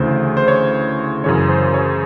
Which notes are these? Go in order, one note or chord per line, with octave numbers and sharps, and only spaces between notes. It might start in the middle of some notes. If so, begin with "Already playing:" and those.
Already playing: D2 C#3 E3 C5
C5
C#5
F#2 C#3 E3 C#5
C5
C#5